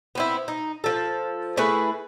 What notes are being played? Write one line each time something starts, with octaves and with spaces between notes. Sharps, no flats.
B3 C4 E4
D#4
F3 A4
A3 E4 G#4 B4